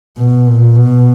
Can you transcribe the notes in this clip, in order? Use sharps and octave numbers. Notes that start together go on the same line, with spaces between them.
B2
A#2
B2